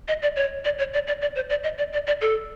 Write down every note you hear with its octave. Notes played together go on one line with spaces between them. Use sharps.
D#5
D5
C#5
D5
C#5
D5
D5
D5
C5
D5
D#5
D5
D5
D5
A4